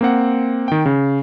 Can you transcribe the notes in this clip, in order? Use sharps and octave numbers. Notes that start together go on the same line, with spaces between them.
A#3 C4 F#5
D#3 G5
C#3